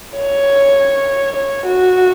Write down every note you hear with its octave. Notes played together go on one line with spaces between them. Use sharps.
C#5
C#5
F#4